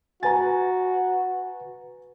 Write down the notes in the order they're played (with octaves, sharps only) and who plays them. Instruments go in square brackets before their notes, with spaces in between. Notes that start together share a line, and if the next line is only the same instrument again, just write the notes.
[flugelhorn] F#4 [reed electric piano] B4 A6 [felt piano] G#5 A#5